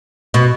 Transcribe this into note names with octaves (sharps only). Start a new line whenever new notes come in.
B2